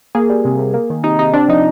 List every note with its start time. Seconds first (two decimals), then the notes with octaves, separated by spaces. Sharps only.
0.15 A#3 G#4
0.30 G3
0.45 C3
0.59 C3
0.74 A#3
0.90 D#3
1.04 C3 D#4
1.19 C3 D#4
1.33 C4 D4
1.48 F3 D#4